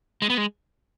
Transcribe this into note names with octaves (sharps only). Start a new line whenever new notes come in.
G#3
B3
G#3